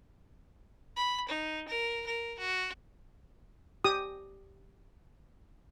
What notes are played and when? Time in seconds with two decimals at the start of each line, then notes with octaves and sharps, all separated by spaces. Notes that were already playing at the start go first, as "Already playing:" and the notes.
0.96 B5
1.29 D#4
1.68 A#4
2.07 A#4
2.39 F#4
3.84 G4 D#6